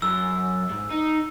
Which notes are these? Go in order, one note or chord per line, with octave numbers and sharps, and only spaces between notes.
F#2 F#3 E6
G#2
D#4